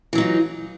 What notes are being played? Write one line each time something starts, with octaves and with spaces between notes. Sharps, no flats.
E3 F#3 D#4 F4